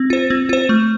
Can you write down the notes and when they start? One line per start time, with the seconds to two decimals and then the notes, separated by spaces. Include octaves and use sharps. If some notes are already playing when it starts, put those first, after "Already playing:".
Already playing: C4
0.10 F4 C5
0.30 C4
0.49 F4 C5
0.69 A3